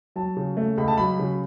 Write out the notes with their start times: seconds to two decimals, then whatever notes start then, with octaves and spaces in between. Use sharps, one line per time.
0.16 F#3 A5
0.37 C#3
0.57 A3
0.77 C#2 B5
0.88 A5
0.98 F#3 B5
1.19 C#3